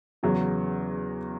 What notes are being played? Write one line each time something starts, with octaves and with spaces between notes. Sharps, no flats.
E2 C#3 F#3